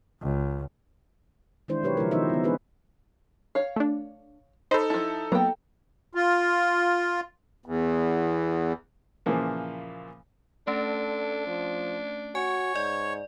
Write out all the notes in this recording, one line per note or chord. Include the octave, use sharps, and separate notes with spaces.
C#2
D#3 E3 G#3 D4 E4 C5
B2 F#3 G4 B4 C#5
C#3 F3 G#3 E4 A#4
D#3 F3 B3 D#4 C5 E5
E3 B3
B3 C4 D4 D#4 G#4 B4
C#5 F5
A3 D4
D#4 A4 C5 D#5 B5
F3 E4 A5
F#3 A#3 B3 G5 A#5
F4
E2
A#2 C#3 E3 F3 A#3
A3 C#4 D4 A4
F3
F#4 C#5 G#5
G#2 D5